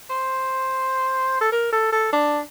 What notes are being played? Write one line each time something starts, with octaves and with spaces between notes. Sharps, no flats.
C5
A4
A#4
A4
A4
D4